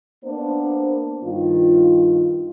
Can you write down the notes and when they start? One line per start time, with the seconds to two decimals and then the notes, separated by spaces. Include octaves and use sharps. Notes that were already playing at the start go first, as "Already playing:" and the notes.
0.24 A#3 B3 D4 C5
1.24 G2 D#3 F4